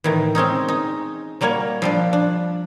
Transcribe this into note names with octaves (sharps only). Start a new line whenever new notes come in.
A2 D#3 E3
G#3 C4 C#4 D#4
D#4
F#3 G3 A#3 C#5
F3 G3 D4
D4